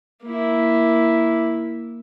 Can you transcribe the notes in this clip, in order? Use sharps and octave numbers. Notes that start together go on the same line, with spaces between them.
A#3 E4